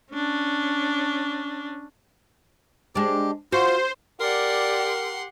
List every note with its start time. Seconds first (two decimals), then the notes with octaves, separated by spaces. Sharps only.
0.12 C#4 D4
2.95 G#3 D4 G4
3.52 F4 F#4 C5
4.20 G4 A#4 D5 F#5 C6